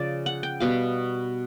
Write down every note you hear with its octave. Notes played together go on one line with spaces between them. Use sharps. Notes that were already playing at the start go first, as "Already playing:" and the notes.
Already playing: C#3 F3 D5
F#5
G5
B2 G3 B3 F5